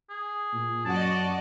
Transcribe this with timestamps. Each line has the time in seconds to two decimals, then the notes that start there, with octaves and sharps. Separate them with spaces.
0.10 G#4
0.53 A#2
0.85 F#2 F#4 D5 D#5 A5